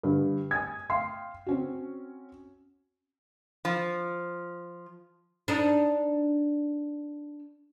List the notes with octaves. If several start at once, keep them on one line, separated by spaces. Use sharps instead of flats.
G2 D3
G#5 D#6 G#6
F5 G5 C6 C7
C4 C#4 F#4
F3
D4 D#4